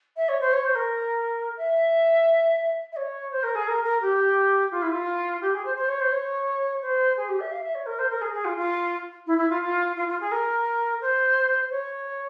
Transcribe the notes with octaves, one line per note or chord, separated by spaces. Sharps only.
E5
C#5
C5
C#5
C5
A#4
E5
E5
C#5
C5
A#4
G#4
A#4
A#4
G4
F4
E4
F4
G4
G#4
C5
C5
C#5
C5
C#5
C5
G#4
G4
E5
F5
E5
C#5
A#4
C5
A#4
G#4
G#4
F4
F4
E4
E4
F4
F4
F4
F4
G#4
A#4
C5
C#5